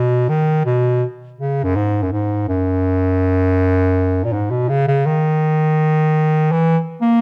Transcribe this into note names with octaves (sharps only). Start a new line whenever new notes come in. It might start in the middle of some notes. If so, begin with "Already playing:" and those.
Already playing: B2
D#3
B2
C#3
F#2
G#2
F#2
G#2
F#2
A#2
G#2
B2
C#3
C#3
D#3
E3
A#3